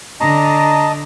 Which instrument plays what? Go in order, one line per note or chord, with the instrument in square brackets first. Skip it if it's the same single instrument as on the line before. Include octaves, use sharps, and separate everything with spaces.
[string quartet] D3 [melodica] D#5 A5 [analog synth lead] A#5